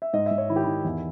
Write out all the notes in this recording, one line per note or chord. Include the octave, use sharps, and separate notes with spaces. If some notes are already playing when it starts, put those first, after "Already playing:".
E5
G#2 D#5
G#2 E5
C#5
D#3 E4
G4
D#3 E4
E2